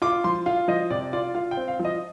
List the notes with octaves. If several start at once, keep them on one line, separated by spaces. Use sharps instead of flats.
F4 D6
F3 C6
F4 F5
F3 D#5
C3 D5
F4 D5
F4 F5
G5
C4
F5
F3
D#5